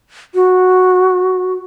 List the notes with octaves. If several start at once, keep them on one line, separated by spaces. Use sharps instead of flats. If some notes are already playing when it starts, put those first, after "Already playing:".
F#4